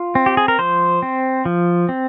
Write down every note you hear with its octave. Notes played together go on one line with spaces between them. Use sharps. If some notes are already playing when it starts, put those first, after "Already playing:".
Already playing: F4
C4
G4
G#4
A#4
F3 C5
C4
F3
C4